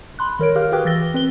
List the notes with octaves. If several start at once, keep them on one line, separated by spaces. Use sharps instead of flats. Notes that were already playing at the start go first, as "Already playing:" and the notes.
B5 C6 F#6
D#3 A#4 C#5 D7
G4 A#4 F5 F6
F#4 G#4 B4 G5 D6 F#6
E3 E6 A6 A#6 G7
C4 B4 G7